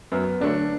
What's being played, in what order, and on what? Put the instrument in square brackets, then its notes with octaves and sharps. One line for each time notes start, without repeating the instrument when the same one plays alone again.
[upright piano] F#2 [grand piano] B3
[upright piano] D3 F#3 A3 [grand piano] D4